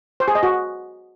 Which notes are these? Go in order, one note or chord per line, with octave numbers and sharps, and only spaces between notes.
C5
G#4
D#5
F#4